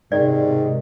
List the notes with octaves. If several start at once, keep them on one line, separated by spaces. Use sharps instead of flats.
G#2 C3 D#3 D5